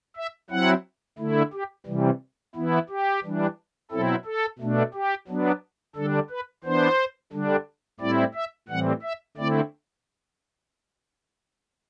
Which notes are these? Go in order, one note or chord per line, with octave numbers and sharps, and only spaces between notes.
E5
F#3 C4 E4 F#5
D3 A3 E4
G4
C3 E3 G3
E3 B3 E4
G4
E3 G3 D4
B2 F#3 C4 E4 A4
A4
B2 A3 D4
G4
F#3 B3 D4
D3 G3 D4 A4
B4
E3 B3 D4 C5
D3 G3 D4
A2 G3 C4 E4 D5
E5
A2 E3 G3 C4 F#5
E5
D3 A3 C4 E4 D5